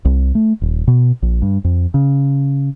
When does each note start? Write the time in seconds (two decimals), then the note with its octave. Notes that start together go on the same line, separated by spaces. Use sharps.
0.05 C2
0.35 A3
0.61 D#1
0.87 B2
1.22 A#1
1.42 G2
1.64 F2
1.94 C#3